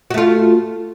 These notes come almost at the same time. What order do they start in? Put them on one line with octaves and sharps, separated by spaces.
F#4 A3 F4